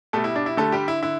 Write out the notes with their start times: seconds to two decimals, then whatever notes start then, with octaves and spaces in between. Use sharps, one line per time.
0.13 B2 G3 A3 A4
0.24 E4
0.36 D4
0.46 E4
0.57 D3 G3 A3 A4
0.72 G3 G4
0.88 E4
1.03 D3 E4